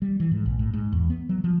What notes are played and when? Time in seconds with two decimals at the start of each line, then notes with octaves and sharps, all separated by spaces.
0.02 G3
0.20 E3
0.31 G#2
0.46 A#1
0.59 A2
0.74 G#2
0.92 E2
1.10 B3
1.29 F#3
1.44 F3